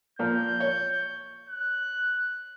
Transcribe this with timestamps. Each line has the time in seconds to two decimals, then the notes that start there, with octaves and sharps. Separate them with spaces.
0.19 A#2 F3 A#3 G6
0.60 C#5
1.49 F#6